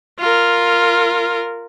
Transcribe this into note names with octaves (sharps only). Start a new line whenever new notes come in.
F4 A#4